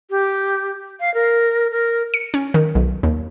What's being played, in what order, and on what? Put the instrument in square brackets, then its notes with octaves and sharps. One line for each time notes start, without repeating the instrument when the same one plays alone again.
[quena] G4
F5
A#4
A#4
[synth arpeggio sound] C#7
C#4
D#3
B1
D#2